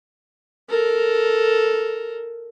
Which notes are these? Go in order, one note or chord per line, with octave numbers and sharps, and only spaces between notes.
A4 A#4